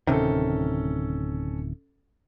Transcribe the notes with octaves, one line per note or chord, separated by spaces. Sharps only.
D1 C3 D#3 C#4 A4